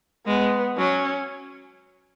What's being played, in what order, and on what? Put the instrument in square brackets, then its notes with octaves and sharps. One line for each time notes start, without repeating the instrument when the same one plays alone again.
[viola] G#3 [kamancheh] B3
[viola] F#3 [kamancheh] C#4